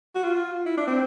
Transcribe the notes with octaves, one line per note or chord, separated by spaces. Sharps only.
F#4
F4
E4
D4
C4